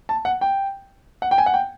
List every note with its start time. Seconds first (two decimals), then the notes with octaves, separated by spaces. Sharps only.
0.09 A5
0.25 F#5
0.41 G5
1.22 F#5
1.31 G5
1.38 G#5
1.46 F#5
1.54 G5